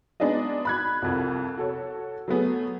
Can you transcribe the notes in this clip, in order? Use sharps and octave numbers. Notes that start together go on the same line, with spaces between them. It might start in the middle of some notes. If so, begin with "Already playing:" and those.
G#3 B3 D4 D#4 G#4 D#5
B5 F#6 G#6
C2 F2
F#4 A4 C#5
F#3 A3 B3 G#4